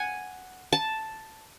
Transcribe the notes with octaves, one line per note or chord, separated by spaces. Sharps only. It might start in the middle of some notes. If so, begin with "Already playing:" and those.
Already playing: F#5 G#5
A5